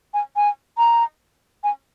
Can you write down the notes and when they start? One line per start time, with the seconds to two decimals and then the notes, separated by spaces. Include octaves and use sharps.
0.14 G#5
0.36 G#5
0.78 A#5
1.64 G#5